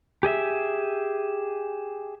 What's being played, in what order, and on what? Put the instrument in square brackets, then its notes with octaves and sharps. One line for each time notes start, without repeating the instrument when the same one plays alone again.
[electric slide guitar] G4 G#4 D#5 E5